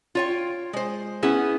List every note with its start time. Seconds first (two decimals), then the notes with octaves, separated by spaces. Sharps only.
0.15 F4 C#5 G5
0.73 G#3 C5
1.23 B3 C#4 E4 G#4